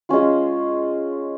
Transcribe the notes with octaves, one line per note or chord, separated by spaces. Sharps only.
G#3 C#4 F4